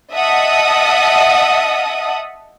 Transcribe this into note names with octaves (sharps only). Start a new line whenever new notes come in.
D#5 E5 F#5 A5 D#6